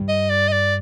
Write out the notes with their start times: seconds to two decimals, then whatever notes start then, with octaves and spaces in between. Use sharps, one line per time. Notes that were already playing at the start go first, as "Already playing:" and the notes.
Already playing: G2
0.08 D#5
0.30 D5
0.48 D#5
0.52 D5